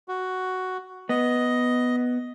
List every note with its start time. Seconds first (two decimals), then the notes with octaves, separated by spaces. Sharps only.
0.08 F#4
1.09 B3 D#5